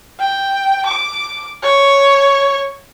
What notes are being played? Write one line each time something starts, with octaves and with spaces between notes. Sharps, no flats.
G5
D6
C#5